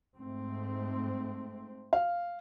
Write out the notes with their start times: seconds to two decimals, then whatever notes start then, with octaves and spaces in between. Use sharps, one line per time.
0.16 G#2 A3 C4
1.93 F5